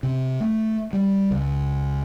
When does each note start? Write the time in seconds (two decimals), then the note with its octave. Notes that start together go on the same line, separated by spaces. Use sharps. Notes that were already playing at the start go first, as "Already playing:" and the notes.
0.03 C3
0.40 A3
0.93 G3
1.31 C#2